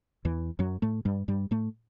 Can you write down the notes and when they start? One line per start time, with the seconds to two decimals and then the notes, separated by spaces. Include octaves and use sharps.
0.25 E2 E3
0.59 F#2 F#3
0.82 A2 A3
1.05 G2 G3
1.28 G2 G3
1.51 A2 A3